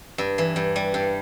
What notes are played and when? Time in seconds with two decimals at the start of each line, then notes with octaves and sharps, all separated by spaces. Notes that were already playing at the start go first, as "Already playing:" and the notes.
0.18 G2
0.38 E3
0.56 G2
0.76 G3
0.94 G2